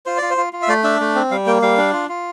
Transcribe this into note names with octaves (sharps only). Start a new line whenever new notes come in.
F4 C5
F4 D5
C5
F4
F4
E5
A3 D5
D4 E5
A3
C4
G3 F5
A#3 G5
G3 F5
D4
F4
F4